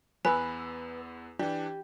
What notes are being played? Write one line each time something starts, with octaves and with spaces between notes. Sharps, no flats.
E2 B3 B4 G#5 E6
E3 D4 G4